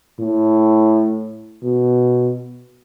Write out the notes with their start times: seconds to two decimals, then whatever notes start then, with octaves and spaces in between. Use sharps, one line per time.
0.19 A2
1.63 B2